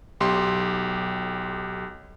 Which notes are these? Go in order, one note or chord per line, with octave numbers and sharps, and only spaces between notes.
B1 G4 C6